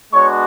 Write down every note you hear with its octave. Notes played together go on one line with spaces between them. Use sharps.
G#3 B3 D4 F#4 C#5 C#6